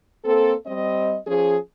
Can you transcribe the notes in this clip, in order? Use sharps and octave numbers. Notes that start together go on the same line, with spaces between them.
A#3 C4 A4
G3 C4 D#5
F3 C#4 G#4